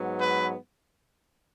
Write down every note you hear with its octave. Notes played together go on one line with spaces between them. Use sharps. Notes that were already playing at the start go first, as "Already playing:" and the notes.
Already playing: G#2 F#3 B3
B4